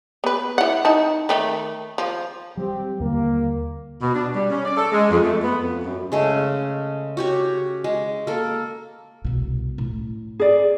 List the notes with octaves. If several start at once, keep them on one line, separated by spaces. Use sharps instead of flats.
B3 B4
E4 F#5
D#4 A5
D#3 A3
F3
F#3 G3 C4 G4
D#2 D3 G3 A#3
B2
D4
G3
C#4
D5
A4
G#3
F2
A3
B3
F2
F#2
C#3 G#3 A3
F#4 G4 C#5
G#3
A#3 A4
C2 B2
A2
G#4 D5